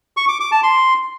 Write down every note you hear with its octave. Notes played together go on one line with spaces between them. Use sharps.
C#6
D6
D6
A5
C6